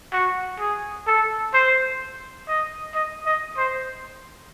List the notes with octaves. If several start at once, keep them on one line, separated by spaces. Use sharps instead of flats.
F#4
G#4
A4
C5
D#5
D#5
D#5
C5